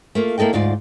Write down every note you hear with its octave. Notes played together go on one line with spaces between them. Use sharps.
A3 A#3 F4
A#3 E4 A4 D#5 G5
D2 G#2 F4 D5